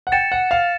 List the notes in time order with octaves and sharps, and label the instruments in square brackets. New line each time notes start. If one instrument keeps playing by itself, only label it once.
[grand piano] F#5
[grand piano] G5 [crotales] A6 C#7 E7
[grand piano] F#5
F5